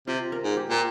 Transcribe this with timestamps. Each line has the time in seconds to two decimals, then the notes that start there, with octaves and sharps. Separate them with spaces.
0.07 C3 F4
0.32 A#4
0.44 G#2
0.57 G4
0.70 A#2